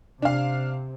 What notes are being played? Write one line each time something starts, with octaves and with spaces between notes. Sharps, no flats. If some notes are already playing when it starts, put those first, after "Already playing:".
C3 D4 F5